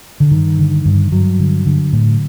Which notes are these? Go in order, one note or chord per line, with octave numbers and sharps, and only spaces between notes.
D3
G2 D#3
D3
G2
G2 F#3
D3
D3
A2